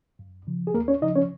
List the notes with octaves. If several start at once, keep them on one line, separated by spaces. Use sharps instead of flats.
F#2
C#3 F3
G#4
D#2 A#3 A#4
C#4 C#5
C#3 F3 D#4 D#5
C#4 C#5